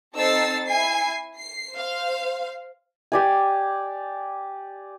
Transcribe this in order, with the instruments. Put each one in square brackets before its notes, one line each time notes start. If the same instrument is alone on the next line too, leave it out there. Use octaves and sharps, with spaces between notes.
[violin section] C4 D#4 A4 E6 A6 C7
E4 G#5 C7
C7
C5 F5
[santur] G4 D5 G#5